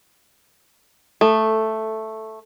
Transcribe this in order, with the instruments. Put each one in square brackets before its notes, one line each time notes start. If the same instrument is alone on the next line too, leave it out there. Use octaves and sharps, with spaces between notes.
[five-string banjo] A3 [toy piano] A4